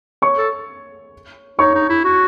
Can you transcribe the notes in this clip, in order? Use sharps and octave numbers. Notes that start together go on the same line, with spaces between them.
C#5 C#6
A4
D#4 C#5 C#6
D#4
E4
F#4